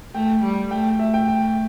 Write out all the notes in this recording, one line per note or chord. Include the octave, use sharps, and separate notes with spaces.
A3 G5
G3
A3 G5
A3 E5
G5
G5